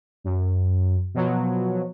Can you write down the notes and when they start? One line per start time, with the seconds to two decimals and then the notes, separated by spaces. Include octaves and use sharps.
0.24 F#2
1.14 B2 F3 F#3